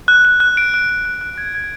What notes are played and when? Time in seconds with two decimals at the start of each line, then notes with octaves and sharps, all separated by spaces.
0.08 F#6
0.25 F#6
0.40 F#6
0.57 D7
0.74 F#6
0.90 D7
1.05 F#6
1.21 F#6
1.37 G#6
1.55 G#6